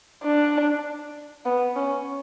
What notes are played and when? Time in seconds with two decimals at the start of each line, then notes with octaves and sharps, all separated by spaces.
0.23 D4
1.45 B3
1.76 C#4